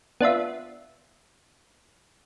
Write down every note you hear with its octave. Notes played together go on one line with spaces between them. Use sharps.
B3 D4 F4 E5